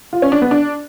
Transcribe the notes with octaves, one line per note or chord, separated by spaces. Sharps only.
F4
C#4
D4
B3
D4